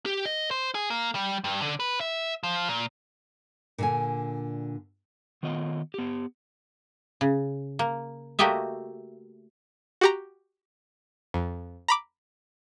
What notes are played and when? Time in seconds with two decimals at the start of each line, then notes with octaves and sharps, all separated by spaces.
0.06 G4
0.26 D#5
0.51 C5
0.75 G#4
0.90 A#3
1.15 G3
1.44 G2
1.62 D3
1.80 B4
2.01 E5
2.43 F3
2.68 A#2
3.78 A#2 D3 G#5
5.43 D#3 B3 F4 D#5
5.94 B3 G4
7.21 C#3
7.79 A#3
8.39 A3 A#3 F#4 G4 D#5 E5
10.01 F#4 G4 A#5
11.34 F2
11.88 A#5 B5 D6